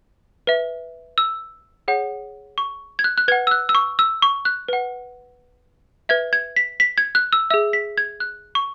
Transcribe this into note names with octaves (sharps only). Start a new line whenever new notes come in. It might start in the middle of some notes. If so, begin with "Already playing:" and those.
B4 E5
E6
G#4 C#5 F#5
C#6
G#6
F#6
F#6
B4 F#5 G#6
E6
F#6
E6
C#6
E6
C#6
F#6
B4 F#5
B4 E5 G#6
G#6
B6
B6
G#6
F#6
E6
G#4 E5 E6
B6
G#6
F#6
C#6